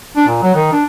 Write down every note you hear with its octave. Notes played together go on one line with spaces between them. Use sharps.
D4
A#2
F#3
D#3
D4